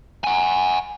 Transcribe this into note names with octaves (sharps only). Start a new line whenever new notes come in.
F#5 G#5